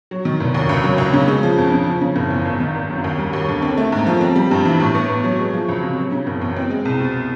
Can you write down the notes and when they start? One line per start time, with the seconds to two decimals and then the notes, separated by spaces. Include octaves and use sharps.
0.11 F#3
0.25 D#3
0.40 F1
0.54 D#2
0.69 C#2
0.84 F#3
0.98 C#2
1.13 C#3
1.28 G#3
1.43 F3
1.58 F2
1.72 C#3
1.87 F3
2.01 C#3
2.16 F#1
2.30 E2
2.45 G#1
2.60 D#3
2.74 G#1
2.90 F#2
3.04 D#2
3.18 G3
3.33 D#2
3.49 D3
3.62 C4
3.77 A3
3.92 G#2
4.07 F3
4.21 C4
4.36 G3
4.51 G2
4.65 E3
4.80 A2
4.95 B3
5.09 A2
5.24 F#3
5.39 G#3
5.53 F3
5.69 C#2
5.83 C3
5.98 F#3
6.12 C#3
6.27 F#1
6.41 E2
6.56 C4
6.70 G#3
6.85 C2
6.99 B2